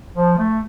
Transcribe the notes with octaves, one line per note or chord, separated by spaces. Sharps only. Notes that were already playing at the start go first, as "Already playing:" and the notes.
F3
A3